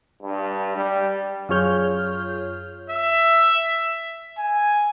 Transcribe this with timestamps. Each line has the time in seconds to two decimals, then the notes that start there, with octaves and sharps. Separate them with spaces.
0.23 G2
0.77 G3
1.49 F#2 F4 G#4 C#5 F6 G6
2.90 E5
4.38 G#5